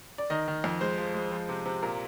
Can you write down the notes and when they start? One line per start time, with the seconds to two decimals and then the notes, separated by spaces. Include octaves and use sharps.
0.18 D5
0.30 D#3 D#5
0.48 D#3
0.64 F2
0.81 G#3 C5
0.98 F3
1.15 G#3
1.32 F3
1.49 C3
1.66 C3
1.83 A#2 A#4